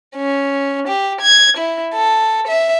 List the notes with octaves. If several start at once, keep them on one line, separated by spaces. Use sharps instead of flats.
C#4
G4
G#6
E4
A4
E5